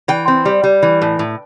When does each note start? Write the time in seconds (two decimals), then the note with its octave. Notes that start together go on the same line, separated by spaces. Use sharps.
0.08 E3 G5
0.28 C4
0.45 G3
0.64 G3
0.83 E3
1.02 A2
1.19 A2